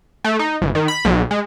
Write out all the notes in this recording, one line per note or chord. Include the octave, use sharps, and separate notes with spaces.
A3
D#4
G1
D#3
B5
B1
G#3